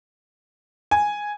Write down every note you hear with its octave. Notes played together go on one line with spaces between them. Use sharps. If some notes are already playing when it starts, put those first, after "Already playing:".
G#5